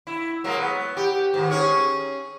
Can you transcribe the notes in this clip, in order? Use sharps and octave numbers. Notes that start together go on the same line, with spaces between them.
E4
F#3 G#3 A#3
B3
G4
G#2 D#3
C#4 G#4 C#5